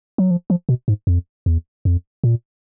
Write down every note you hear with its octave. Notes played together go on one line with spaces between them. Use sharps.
F#3
F3
F3
B2
G#2
F2
E2
F2
A#2